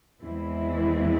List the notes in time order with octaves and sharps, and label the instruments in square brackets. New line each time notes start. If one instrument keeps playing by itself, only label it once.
[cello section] E2 E3 G#3 C4 E4